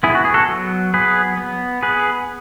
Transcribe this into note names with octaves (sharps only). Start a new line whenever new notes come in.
B3 E4 G#4
F#4
G#4
F#4 A4
F#3
B3 G#4 B4
B3
B3 G#4 B4